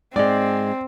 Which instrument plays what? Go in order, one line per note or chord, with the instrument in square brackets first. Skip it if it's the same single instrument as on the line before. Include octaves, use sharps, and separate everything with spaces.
[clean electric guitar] G#2 G#3 [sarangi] C4 [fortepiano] D5